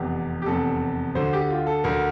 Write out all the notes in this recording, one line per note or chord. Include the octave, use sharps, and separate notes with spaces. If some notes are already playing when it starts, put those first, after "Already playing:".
Already playing: F1 E2 C3 G4
G4
F1 E2 C3 A4
D2 D3 C5
G4
F4
A4
D2 D3 A#4